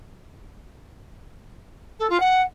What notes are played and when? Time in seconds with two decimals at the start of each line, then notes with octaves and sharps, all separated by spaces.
1.99 A4
2.09 F4
2.20 F#5